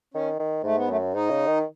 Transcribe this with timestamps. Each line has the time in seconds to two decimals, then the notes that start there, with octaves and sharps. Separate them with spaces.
0.14 D#3 C#4
0.39 D#3
0.64 G#2 A3
0.77 B3
0.89 F#2 A3
1.14 G#2 D#4
1.30 C#3
1.47 D#3